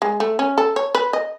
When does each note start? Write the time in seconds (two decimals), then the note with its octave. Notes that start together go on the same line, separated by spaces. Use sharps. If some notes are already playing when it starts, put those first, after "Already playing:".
0.02 G#3
0.20 A3
0.39 C#4
0.58 A4
0.76 C#5
0.95 B4
1.13 D#5